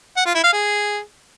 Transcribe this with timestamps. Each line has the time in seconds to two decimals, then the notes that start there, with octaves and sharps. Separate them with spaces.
0.17 F#5
0.26 F4
0.35 E4
0.44 F5
0.53 G#4